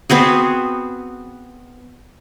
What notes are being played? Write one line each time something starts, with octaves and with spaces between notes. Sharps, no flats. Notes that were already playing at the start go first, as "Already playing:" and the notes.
B3 C4 F#4 G#4